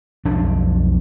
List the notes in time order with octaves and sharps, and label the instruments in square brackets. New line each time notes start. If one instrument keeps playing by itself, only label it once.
[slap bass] B1 F2 D4